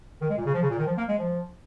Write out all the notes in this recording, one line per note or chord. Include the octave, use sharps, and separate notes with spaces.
D#3
G#3
A#2
C#3
F3
C#3
A#2
D#3
F3
A#3
G#3
F3